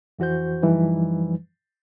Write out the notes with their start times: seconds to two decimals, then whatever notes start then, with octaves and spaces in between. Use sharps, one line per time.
0.19 F2 E3 F#4 C5 G6
0.62 F#2 E3 F3 G3 D#4 B4